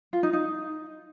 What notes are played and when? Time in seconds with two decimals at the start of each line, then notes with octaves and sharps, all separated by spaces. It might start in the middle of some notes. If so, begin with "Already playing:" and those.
0.13 F4
0.23 D#4
0.33 D#4